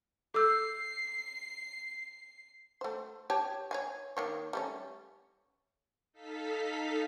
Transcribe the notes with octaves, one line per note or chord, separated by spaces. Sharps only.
A4 D6 E6 G6 C7
A3 C5
G4 C#5 A5
C#5 F5 G#5
D#3 A#3 C#5
G3 A3 C#4
D#4 A4 F5 B6